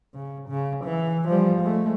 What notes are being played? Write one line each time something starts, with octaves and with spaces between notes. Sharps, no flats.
C#3
C#3
E3
F3 G3
G#3 A3